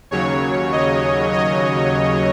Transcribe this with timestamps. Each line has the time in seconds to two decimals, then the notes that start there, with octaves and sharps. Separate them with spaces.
0.11 D#2 C#3 F#3 C#5
0.72 D#5
1.33 D#5